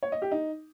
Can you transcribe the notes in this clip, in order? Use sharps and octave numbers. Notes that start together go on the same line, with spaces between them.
C#5
D#5
G4
D#4